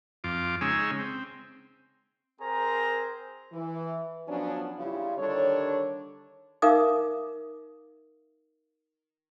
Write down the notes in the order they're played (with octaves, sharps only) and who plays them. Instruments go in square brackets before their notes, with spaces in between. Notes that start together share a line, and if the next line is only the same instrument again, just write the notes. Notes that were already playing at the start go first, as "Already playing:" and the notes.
[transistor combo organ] F2 F4 D6
C#3 G#3 C#4 D#4 G#5 E6
C4
[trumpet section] C4 G#4 A#4 C5 A#5
[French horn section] E3
F3 F#3 B3 C#4 D4
C#3 G3 E4 F4
D3 D#3 G3 D4 C#5
[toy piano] D#4 A#4 E5 F5 D6 D#6